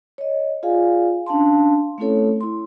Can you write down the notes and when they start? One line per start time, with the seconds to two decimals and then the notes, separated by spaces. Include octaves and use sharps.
0.18 C#5 D#5
0.63 F4 G#4 D5 F5 G#5
1.26 C#4 D4 F5 A5 C6
1.98 A3 C4 C#4 E4 A4 C#5
2.41 E4 C6